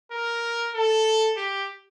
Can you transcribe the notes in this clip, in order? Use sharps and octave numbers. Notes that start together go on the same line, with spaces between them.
A#4
A4
G4